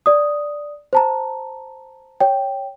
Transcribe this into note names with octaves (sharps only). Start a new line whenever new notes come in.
D5 D#6
C5 A5 A#5
C#5 G5